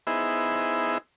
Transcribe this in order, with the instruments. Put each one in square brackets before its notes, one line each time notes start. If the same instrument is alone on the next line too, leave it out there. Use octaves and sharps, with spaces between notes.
[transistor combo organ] B3 D#4 E4 G#4 C5 E5